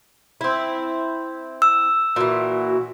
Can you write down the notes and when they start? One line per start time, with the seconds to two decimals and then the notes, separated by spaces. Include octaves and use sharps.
0.41 C4 E4
1.62 E6
2.16 A#2 E3 F#4